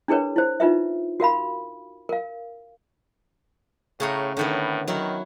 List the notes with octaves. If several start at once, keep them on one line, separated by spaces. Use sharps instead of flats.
D4 E4 G#4 A#4 B4 C#5
E4 C5
D#4 F4 B4 E5
F#4 A#4 F5 B5
A#4 F5
A2 C#3 C#5 A#5
A2 D3 D#3 B3
D#3 F#3 E4 F#4